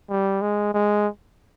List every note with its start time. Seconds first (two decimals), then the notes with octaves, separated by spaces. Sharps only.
0.09 G3
0.42 G#3
0.74 G#3